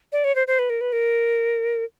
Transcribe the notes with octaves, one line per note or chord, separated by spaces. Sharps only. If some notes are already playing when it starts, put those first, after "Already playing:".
D5
C#5
C5
C5
B4
A#4
B4
A#4